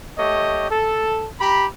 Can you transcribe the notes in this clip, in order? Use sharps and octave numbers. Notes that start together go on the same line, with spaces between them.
A3 G4 C#5 D#5
A4
G4 A#5 B5